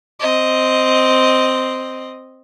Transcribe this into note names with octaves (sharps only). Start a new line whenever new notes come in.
C4 D#5